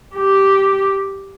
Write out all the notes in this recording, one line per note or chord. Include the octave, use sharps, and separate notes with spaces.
G4